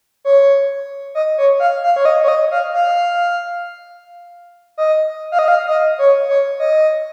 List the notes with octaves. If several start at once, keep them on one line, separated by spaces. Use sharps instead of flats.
C#5
D#5
C#5
F5
F5
C#5
D#5
C#5
D#5
F5
F5
D#5
F5
D#5
F5
D#5
C#5
C#5
D#5